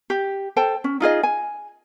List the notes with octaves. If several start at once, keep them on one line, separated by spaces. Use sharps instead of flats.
G4
A4 C5 G5 A5
C#4
D#4 F4 G#4 D#5
G#5